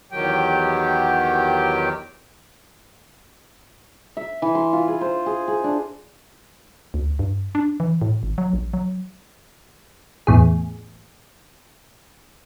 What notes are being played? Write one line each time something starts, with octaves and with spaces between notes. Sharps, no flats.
E2 D#3 F#3 G4 G5
E5
E3
C6
F4
G#4
C5
G#4
G#4
D4
D2
G2
D4
E3
A2
G#1
F#3
A#1
F#3
E2 A2 G#4